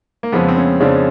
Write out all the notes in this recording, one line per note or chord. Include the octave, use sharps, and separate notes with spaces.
A#3
F2 C#3 F3 G#3 B3
C4
C#4
F2 C#3 F3 G#3 D4